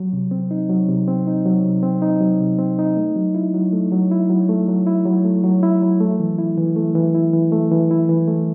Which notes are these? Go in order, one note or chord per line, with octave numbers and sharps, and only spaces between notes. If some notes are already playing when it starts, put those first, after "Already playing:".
Already playing: F#3
C3
C4
D#4
F#3
C3
C4
D#4
F#3
C3
C4
D#4
F#3
C3
C4
D#4
A3
F#3
E4
F#3
A3
F#3
E4
F#3
A3
F#3
E4
F#3
A3
F#3
E4
F#3
A3
E3
E4
E3
A3
E3
E4
E3
A3
E3
E4
E3
A3